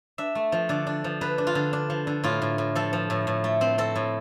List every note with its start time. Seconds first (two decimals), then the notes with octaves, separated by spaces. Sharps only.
0.18 D4 E5
0.35 A3
0.52 F3
0.69 D3 D5
0.87 D4
1.04 F3
1.21 D3 B4
1.38 D4
1.47 F4
1.55 D3
1.73 D4
1.90 F3
2.07 D3
2.24 A2 F4
2.42 A2
2.58 A2
2.75 F3 A4
2.93 F3
3.10 A2
3.27 A2
3.44 A3
3.61 C4
3.78 C4 A4
3.95 A2